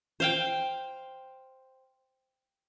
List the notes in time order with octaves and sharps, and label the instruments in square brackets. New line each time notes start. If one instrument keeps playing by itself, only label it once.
[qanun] C5 F5 G5